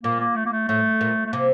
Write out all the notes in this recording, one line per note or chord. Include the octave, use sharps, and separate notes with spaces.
A#2 A#3
A#3
A3
A#3
A3
A2 A3
A#2
A3
C3 A#3